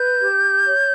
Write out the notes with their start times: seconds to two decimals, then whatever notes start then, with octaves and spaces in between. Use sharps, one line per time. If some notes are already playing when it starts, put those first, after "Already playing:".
Already playing: B4 G6
0.19 G4
0.66 C#5